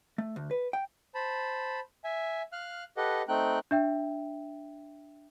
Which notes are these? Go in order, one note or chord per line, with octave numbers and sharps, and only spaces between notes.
A3
D2
B4
G5
C5 A5 B5
E5 G#5
F5 F6 F#6
G4 A4 B4 D#5 F#5
A3 C4 D#4 G5 F#6
D4 E5 G5